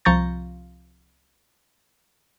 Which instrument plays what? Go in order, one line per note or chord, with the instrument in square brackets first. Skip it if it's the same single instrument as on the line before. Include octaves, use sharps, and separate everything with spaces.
[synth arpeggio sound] C2 F3 A#5 C#6 G6 A6